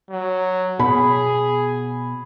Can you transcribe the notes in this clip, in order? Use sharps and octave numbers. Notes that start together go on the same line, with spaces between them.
F#3
B2 G#4 B5